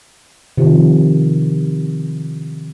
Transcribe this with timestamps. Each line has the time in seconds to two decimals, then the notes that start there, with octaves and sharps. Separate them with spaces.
0.58 C3 D#3 F3